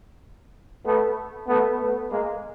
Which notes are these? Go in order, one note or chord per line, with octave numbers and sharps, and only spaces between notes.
A3 B3
A3 B3
A3 B3
G#3 A#3